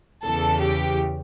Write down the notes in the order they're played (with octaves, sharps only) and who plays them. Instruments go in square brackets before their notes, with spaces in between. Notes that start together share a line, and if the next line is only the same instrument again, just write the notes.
[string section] E2 C#3 E3 A4
G4